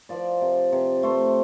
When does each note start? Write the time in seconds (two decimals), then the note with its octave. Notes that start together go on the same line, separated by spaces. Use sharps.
0.09 F3 D5
0.42 C3
0.72 C3
1.03 A3 C5